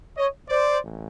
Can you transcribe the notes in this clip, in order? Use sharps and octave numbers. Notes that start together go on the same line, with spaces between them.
C#5 D#5
C5 D5
A1